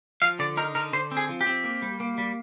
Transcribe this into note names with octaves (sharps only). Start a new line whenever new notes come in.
F3 F5
D3 D5
D#4 A#4
D3 A#4
D3 C5
C4
G#4
F3
G4
C4
A#3
G3
A#3
G3